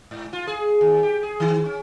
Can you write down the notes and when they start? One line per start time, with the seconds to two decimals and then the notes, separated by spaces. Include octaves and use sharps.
0.11 G#2
0.33 F4
0.47 G#4
0.81 D#2
1.03 G4
1.23 G#4
1.40 D#3
1.65 C#4